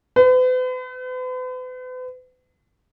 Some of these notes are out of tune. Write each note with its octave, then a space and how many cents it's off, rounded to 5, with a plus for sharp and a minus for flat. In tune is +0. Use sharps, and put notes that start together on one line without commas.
B4 +45